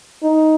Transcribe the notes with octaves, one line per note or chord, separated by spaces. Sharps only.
D#4